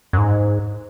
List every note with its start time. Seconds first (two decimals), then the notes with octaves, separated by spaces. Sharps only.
0.13 F#2
0.18 G#2